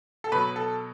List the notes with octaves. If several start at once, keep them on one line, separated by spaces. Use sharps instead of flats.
A4
B2 F#3 B4
A4